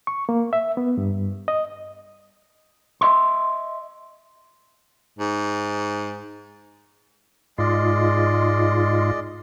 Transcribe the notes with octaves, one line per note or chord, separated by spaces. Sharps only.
C#6
A#3
E5
B3
G2
D#5
D#5 E5 C6
G#2
G#2 G#3 F4 D5 D#5